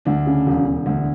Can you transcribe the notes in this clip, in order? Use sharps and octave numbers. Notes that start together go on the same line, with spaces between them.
D2 D4
C#3
E1
E1
D2